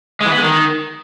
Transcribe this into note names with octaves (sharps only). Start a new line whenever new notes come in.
G#3
E3
B3
G#3
D#3